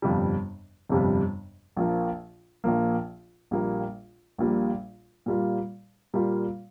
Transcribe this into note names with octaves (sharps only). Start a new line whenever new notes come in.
G1 F2 C3 G3
G1 F2 C3 G3
A#1 A#2 F3 A#3
A#1 A#2 F3 A#3
A#1 A#2 G3 A#3
A#1 A#2 G3 A#3
A#2 G3 A#3 F4
A#2 G3 A#3 F4